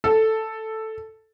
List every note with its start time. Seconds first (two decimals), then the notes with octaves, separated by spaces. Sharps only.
0.04 A4